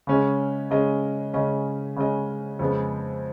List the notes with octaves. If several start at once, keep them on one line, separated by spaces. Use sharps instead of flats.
C#3 G#3 C#4 G#4 D#5
C#3 G#3 C#4 G#4 D#5
C#3 G#3 C#4 G#4 D#5
C#3 G#3 C#4 G#4 D#5
F2 C#3 G#3 B3